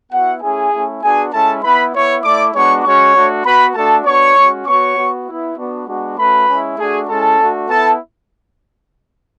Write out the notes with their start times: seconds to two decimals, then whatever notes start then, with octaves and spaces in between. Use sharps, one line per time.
0.12 B3 E4 F#4 F#5
0.42 A3 C#4 E4 G#4 G#5
0.72 A3 C#4 E4
1.03 B3 D4 F#4 G#4 G#5
1.33 G#3 C#4 E4 A4 A5
1.63 B3 E4 B4 B5
1.93 B3 E4 C#5 C#6
2.24 A3 E4 D5 D6
2.54 G#3 B3 D4 F#4 C#5 C#6
2.84 G#3 C#4 F#4 C#5 C#6
3.15 A3 D4 F#4
3.45 B3 F#4 B4 B5
3.75 A3 D4 F#4 A4 A5
4.05 B3 D4 F#4 C#5 C#6
4.36 G#3 C#4 F#4
4.66 B3 F#4 C#5 C#6
4.97 B3 F#4
5.27 B3 E4
5.57 B3 D4 F#4
5.87 G#3 B3 D4 F#4
6.18 A3 C#4 F#4 B4 B5
6.49 G#3 C#4 E4
6.78 A3 D4 F#4 G#4 G#5
7.08 G#3 C#4 E4 A4 A5
7.39 A3 D4 F#4
7.69 B3 E4 A4 A5